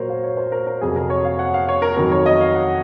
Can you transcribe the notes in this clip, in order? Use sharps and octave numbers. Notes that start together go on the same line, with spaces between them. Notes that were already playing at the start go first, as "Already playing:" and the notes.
Already playing: A#2 F#3 A#3 A#4 C5 C#5
F5
C#5
C5
A#4
A#4
F2 C3 F#3 G#4
A#4
C#5
F5
F#5
F5
C#5
A#4
F2 D#3 F#3 A#4
C#5
D#5
F5
F#5